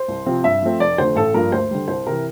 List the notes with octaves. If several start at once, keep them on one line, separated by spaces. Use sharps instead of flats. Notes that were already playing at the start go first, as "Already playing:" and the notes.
Already playing: C5
C2
C3 F3 C4
G2 E5
F3 A3 C4
F1 D5
F2 D3 A3 C5
A1 A4
G2 F3 A#3 D4 A#4
D2 C5
D3 G3
C2 C5
C3 E3 A#4